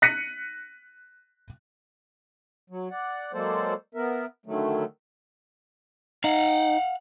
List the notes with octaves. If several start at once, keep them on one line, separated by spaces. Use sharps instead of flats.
F#6 A#6 B6 C#7 D#7
F#3
D5 F#5
F#3 G#3 A#3 A4 C5 D5
B3 A#4 E5
D3 D#3 F#3 A3
D#4 F5 F#5